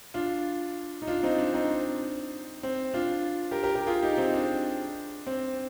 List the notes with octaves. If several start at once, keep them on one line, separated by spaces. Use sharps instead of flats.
D4 F4
D#4
D4 F4
C4 D#4
D4
C4 D#4
C4
D4 F4
G4 A#4
G4 A#4
G4 A#4
F4 G#4
D#4 G4
C4 D#4
D4
C4